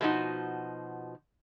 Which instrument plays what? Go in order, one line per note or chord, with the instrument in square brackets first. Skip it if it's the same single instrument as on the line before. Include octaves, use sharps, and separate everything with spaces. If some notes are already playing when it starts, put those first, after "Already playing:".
[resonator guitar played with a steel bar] B2 F3 G#3 A3 D#4 F#4